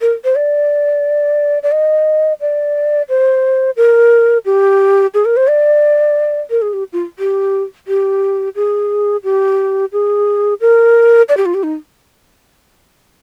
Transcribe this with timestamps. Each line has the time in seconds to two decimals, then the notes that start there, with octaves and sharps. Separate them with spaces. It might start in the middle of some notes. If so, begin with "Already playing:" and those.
0.01 A#4
0.24 C5
0.36 D5
1.63 D5
1.72 D#5
2.41 D5
3.09 C5
3.77 A#4
4.45 G4
5.14 G#4
5.25 A#4
5.37 C5
5.48 D5
6.50 A#4
6.62 G#4
6.73 G4
6.93 F4
7.19 G4
7.88 G4
8.56 G#4
9.24 G4
9.92 G#4
10.61 A#4
11.29 D5
11.37 G4
11.46 F4
11.54 G4
11.63 D#4